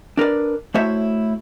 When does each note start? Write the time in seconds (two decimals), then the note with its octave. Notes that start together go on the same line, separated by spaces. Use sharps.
0.17 D4 A#4 B4 D5
0.74 A3 E4 F#4 C5 C#5 E5